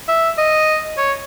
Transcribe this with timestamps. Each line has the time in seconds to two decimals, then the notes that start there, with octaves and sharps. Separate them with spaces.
0.09 E5
0.38 D#5
0.98 C#5